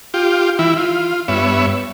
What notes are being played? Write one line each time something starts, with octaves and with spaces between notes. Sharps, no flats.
F4 G4
E3 E4
F4
G2 B3 C#5 E5